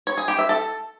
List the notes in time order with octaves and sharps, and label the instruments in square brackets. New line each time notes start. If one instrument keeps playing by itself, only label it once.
[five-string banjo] C#5
G#4
G4
E5
A4